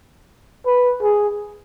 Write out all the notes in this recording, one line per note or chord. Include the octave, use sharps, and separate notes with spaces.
B4
G#4